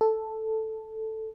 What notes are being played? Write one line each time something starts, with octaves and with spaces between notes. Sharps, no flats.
A4